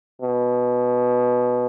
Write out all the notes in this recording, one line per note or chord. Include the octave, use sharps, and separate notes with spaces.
B2